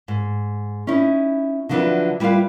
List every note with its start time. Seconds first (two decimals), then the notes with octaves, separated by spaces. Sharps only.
0.08 G#2
0.87 C#4 D#4 E4
1.69 D3 F3 F#3 D4 E4 B4
2.20 G3 E4 F4 A4 B4 F5